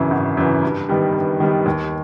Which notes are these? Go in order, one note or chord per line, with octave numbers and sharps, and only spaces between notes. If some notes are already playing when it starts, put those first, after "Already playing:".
Already playing: G#1 F#2 C#3 E3
G#1
F#2 C#3 E3
G2
D#3 G3 B3
G2
D#3 G3 B3
D#2